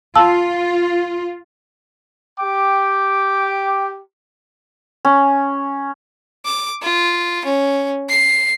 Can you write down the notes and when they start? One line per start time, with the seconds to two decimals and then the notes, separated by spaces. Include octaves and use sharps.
0.16 F4 F5 A5 E6
2.40 G4 G5 D6
5.05 C#4
6.45 D6
6.83 F4
7.45 C#4
8.09 C7